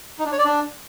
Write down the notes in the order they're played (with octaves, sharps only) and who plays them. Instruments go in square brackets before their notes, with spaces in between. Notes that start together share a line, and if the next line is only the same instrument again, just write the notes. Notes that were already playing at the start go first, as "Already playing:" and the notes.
[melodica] D#4
D4
C#5
D5
D4